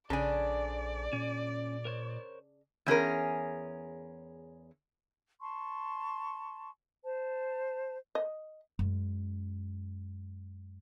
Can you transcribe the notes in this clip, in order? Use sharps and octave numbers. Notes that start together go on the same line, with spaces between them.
A#1 C#3 D4 A4 C5 D5 G#5
A#2 C#4
A#4 C5 C#5
E2 C#4 G#4 A#4
A5 C6 C#6
C5 A5
D#5
F#2 G#3